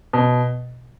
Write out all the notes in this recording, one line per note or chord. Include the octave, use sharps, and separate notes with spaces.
B2